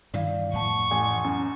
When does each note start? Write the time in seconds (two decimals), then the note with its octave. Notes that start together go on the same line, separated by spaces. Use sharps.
0.14 G2 D#3 E3 D5 F5
0.53 F2 A2 F#5 A5 C#6
0.91 A1 G#5
1.24 F#2